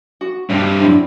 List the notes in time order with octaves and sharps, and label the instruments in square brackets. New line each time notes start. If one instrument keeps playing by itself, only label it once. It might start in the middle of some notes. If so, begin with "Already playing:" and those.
[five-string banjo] F#4
[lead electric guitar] G2 C3 [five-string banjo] D4 G4 D5
[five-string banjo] F#3 C4 E4 [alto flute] D4